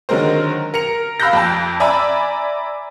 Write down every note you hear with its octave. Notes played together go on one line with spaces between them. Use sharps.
D3 D#3 F#3 G#3 A#4 C5
A#4 C#7 F7
F5 B5 E6 F#6 G6 A#6
F2 G5 A5
D5 E5 G#5 A#5 B5 E6